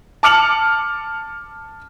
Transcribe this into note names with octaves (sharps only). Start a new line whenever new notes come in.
A5 D6 F6 C#7 F7 F#7